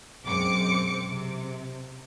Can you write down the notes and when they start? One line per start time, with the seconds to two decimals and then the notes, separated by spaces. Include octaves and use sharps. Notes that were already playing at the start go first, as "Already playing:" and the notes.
0.25 B1 F#2 G#3 C4 D6 C#7
1.11 C3